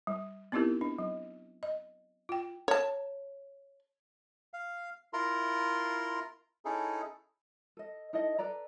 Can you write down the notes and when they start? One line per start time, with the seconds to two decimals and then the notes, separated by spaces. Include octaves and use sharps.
0.07 G3
0.52 B3 C4 D#4 E4 G4 A#4
0.81 D4
0.98 F#3
1.63 D#5
2.29 F4 G5
2.68 C#5 A5
4.54 F5
5.13 E4 F4 A#4 A#5 C6
6.65 C#4 D#4 E4 G#4 A4
7.77 A4 D#5
8.13 D#4 E4 A4 D#5
8.38 A4 B4 D5 A#5